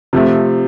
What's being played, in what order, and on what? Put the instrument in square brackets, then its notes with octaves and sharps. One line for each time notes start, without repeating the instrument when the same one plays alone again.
[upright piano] C3 F3 A3